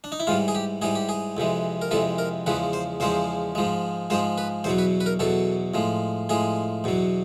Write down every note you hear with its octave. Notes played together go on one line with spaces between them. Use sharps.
D4
D#4
E4
G#2 E3 G3 F4
G#4
G4
G#2 E3 G3 G#4
G4
G#4
F2 C3 E3 G#3
A#4
F2 C3 E3 G#3 A4
A#4
E2 C#3 F3 G#3 B4
C5
E2 C#3 F3 G#3 C5
G#2 F3 G#3
G#2 F3 G#3 C5
B4
E2 B2 F#3 C5
B4
B4
A#4
E2 B2 F#3 A4
A2 F3 G#3
A2 F3 G#3 G#4
E2 B2 F#3